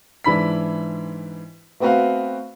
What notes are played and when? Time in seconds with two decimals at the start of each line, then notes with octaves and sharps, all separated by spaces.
0.24 G#2 E3 D4 B5 B6
1.80 A3 B3 C4 F#4 B4 F5